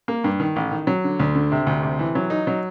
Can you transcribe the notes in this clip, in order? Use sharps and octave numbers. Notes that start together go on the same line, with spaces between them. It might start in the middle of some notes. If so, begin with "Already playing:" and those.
A#3
G2
D#3
A1
D#3
F#3
D3
D2
D3
C3
D2
C3
E3
F#3
D#4
F#3